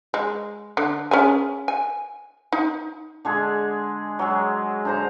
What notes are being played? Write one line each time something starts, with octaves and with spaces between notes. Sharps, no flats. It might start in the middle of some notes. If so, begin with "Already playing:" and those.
G#3
D3
C#4 G#4 G#5
G#5
D#4
D3 G#3 G#4
F#3 G#3
D3 C5 A#5